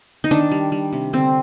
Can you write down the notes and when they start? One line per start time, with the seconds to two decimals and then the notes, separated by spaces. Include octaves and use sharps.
0.24 D#4
0.31 D#3 D4
0.51 G3
0.72 G3
0.93 C3
1.13 D3 C4